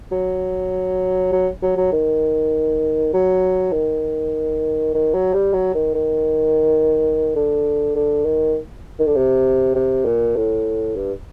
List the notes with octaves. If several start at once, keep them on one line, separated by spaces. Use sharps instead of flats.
F#3
F#3
F#3
F#3
D#3
F#3
D#3
D#3
F#3
G3
F#3
D#3
D#3
D3
D3
D#3
D#3
D3
C3
C3
A#2
A2
G2